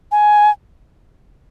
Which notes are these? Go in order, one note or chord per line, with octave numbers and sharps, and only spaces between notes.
G#5